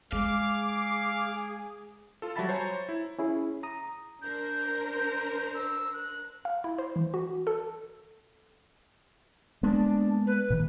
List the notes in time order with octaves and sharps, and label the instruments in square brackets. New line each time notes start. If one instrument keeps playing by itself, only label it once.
[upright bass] G#3 [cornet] G#4 [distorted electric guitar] F5 [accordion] D6
[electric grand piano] F4 A4
F#3 G3 E5 A5 B5 A6
C5 C#5 G#5 A#5
E4
[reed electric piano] C#4 E4 G#4
A#5 D#6
[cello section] D4 A#4 C5 [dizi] G6
[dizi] E6
F#6
[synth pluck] F5
E4
C5
E3
F#4
A4
[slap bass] G#3 A#3 B3 [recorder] D4
[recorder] B4
[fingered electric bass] A#2 D#3 F3